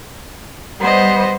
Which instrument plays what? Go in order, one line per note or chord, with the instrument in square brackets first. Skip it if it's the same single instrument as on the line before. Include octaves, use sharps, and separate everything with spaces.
[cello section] G3 C5 [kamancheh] B3 D#5